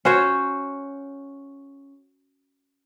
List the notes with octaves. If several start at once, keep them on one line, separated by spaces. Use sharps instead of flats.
C#4 F#4 C5 C#5